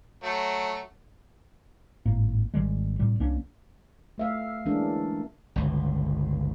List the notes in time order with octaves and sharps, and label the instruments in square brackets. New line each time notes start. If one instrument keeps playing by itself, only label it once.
[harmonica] F#3 A3
[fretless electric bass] G#1 A2 A#3
G#1 D#3 G3 G#3
A2 C3 G3
C2 A#3 C#4 D4
[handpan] A3 E5 F5
E3 G#3 A#3 C#4 D4
[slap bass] G1 C#2